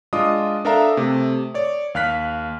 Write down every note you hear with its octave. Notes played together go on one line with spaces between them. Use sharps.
G#3 D4 F4 D#5 D6 D#6
D4 A4 A#4 E5 F5 A#5
C3 A3
C#5 D5
D#2 F5 F6 F#6 B6